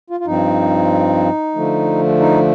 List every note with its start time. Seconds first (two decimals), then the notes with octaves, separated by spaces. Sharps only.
0.10 F4
0.20 F4
0.26 G2 F3 C4 D#4
1.55 D3 F3 A3
2.20 D#4